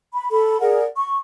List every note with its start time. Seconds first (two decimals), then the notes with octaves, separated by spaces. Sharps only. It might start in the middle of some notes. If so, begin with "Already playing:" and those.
0.12 B5
0.31 A4 B5
0.60 G#4 A#4 D5 F#5
0.95 C#6